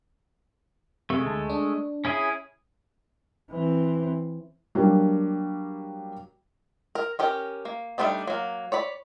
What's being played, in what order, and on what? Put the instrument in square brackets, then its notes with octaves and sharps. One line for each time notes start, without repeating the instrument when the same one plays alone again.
[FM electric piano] C3 [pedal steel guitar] G#3 A3
[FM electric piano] D2 A5
D4
[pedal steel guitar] C#4 E4 G#4
[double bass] E3 C4
[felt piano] F#3 G3 A#3 D4
[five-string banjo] A#4
C#4 G4 A#4
A#3
G3 A3 C4 D4 D#4
F#3 A#3
C#5 D5 B5